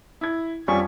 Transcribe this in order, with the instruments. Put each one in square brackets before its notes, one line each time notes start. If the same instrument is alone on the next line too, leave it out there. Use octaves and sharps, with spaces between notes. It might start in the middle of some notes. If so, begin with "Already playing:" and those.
[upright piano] E4 G#6
[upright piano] F2 F3 G3 [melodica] C#4 C#6